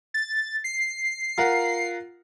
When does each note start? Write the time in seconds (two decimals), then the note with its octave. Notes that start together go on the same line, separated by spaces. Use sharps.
0.14 A6
0.64 C7
1.38 F4 A#4 F#5